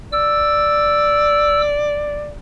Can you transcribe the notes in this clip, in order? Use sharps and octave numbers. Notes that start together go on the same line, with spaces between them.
D5 E6